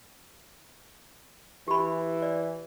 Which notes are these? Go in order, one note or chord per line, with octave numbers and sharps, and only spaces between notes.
E3 G4 B5
D5